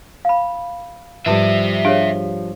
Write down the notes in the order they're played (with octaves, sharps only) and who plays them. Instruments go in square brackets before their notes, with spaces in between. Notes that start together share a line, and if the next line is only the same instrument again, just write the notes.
[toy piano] F5 B5
[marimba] G#2 B4 [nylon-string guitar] F3 G3 [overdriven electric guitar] C5 E5
[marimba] D4 G4 G#4 [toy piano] C#5 F5